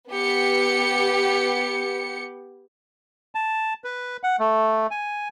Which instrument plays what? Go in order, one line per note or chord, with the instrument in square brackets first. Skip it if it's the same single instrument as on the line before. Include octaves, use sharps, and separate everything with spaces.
[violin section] B3 G4 C#7
[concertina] A5
B4
F#5
A3
G#5